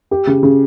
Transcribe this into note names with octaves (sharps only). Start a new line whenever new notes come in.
G4
C#3
C#3